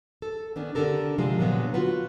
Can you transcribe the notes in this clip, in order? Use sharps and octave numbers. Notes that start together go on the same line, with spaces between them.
A4
D#3 B3 C#4 D4
D3 D4 G4 A4 A#4
C3 F3 G3 G#3
A#2 D3 F#3 B3
F4 F#4 B4